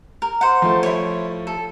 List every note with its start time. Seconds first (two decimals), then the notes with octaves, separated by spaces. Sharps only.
0.22 A#4
0.41 C5 F#5
0.62 F3 A3
0.83 E4 C#5
1.47 A4